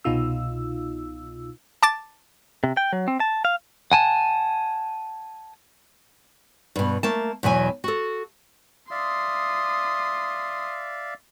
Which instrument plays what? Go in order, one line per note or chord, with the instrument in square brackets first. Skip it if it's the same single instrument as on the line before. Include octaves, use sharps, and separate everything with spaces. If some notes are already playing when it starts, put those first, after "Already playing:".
[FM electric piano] C2 B2 D#4 F4 E6
[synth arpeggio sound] A5 D6 A6
[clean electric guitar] C3
G5
F#3
C4
A5
F5
F#5 G#5 A5
[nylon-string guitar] G2 B2
A3 A#3 A5
E2 B2 F#3 G#5
F#4 A4
[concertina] D5 E5 F5 [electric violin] C6 D#6